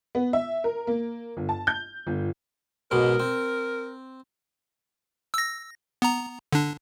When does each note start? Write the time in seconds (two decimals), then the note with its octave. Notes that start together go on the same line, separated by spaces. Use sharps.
0.15 B3
0.33 E5
0.64 A#4
0.87 A#3
1.37 G1
1.49 A5
1.67 G6
2.07 G1
2.91 B1 G#2 B2 A#4
3.20 C4
5.34 E6 A#6
6.02 B3 A#5
6.52 D3 D4